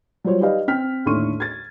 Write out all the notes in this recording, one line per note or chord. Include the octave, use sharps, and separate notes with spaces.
F#3 G3 F4 C5 C#5
D#4 G4 B4 D5 D#5 F5
C4 G5 F6 B6
D#2 A2 D3 C6 C#6 D#7
G#6 A6